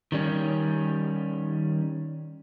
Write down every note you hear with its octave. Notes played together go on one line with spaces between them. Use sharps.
D#3 G3 C#4